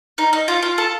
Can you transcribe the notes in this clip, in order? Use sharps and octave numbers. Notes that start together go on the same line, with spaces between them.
D#4
D#4
F4
F4
A4